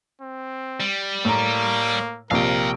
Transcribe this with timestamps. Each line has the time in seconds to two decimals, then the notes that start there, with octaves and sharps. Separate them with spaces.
0.21 C4
0.80 G3
1.25 A2 A#3 A#5
2.31 A#1 C3 A#4 F5 G5